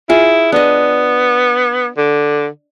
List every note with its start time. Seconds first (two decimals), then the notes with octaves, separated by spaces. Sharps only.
0.09 E4 F4 G#4
0.52 B3 D4 D#5
1.97 D3